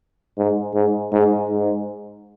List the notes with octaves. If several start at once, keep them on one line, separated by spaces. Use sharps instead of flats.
G#2
G#2
G#2
G#2